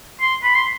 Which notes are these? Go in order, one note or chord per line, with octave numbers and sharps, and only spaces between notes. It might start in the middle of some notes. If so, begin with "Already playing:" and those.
C6
B5
C6